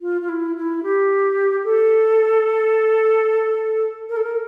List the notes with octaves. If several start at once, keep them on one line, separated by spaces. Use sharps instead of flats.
F4
F4
E4
E4
G4
A4
A#4
A4
A#4